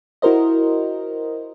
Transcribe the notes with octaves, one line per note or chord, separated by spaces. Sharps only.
E4 F#4 A#4 C5 D#5